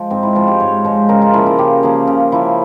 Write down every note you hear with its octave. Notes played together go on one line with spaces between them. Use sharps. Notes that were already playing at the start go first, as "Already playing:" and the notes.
Already playing: F3 G#3
G#2 C4
E4
F3 G#3 F4
G4
G#2 C#5
F3 G#3 C5
C#3 A#4
F4
F3 A#3 E4
F4
C#3 G4
F3 A#3 G#4
C#3
F3 A#3 E4